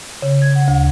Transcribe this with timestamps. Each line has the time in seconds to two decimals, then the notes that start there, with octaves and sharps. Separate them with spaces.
0.22 C#3
0.42 G#6
0.55 F#5
0.68 D2